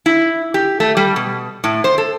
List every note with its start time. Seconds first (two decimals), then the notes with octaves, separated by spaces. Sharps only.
0.06 E4
0.54 G4
0.80 A3
0.97 G3
1.16 B2
1.64 A2
1.84 C5
1.98 A4